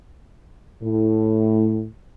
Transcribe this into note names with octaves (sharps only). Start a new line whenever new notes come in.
A2